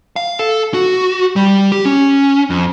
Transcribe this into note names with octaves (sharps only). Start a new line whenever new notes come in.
F5
A4
F#4
G3
G4
C#4
F2